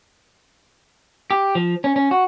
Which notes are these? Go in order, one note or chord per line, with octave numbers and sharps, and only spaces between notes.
G4
F3
C#4
C#4
F#4